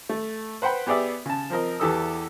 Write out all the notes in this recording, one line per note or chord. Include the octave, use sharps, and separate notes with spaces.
A3
B4 C5 F#5 G5 B5
B3 G4 G#4 D5 E5
C#3 A5
F3 C4 A#4 D#5
E2 E3 G4 A4 D#6 E6